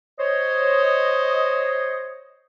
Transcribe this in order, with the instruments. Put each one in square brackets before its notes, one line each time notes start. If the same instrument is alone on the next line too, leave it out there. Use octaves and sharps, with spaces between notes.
[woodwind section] C5 C#5 D#5